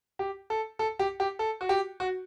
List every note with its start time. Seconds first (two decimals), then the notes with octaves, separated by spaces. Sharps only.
0.19 G4
0.50 A4
0.79 A4
0.99 G4
1.20 G4
1.39 A4
1.61 F#4
1.69 G4
2.00 F#4